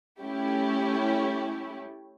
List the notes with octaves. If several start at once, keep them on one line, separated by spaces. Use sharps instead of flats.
A3 C#4 E4 G4